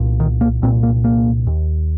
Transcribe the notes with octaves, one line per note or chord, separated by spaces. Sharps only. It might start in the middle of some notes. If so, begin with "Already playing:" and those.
Already playing: C2 A#2
D#3
A#3
C2 A#2 C4
A#3
A#3
D#2